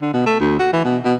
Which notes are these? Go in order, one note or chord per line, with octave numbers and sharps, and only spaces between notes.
D3
B2
A3
D2
F#4
E3
B2
B2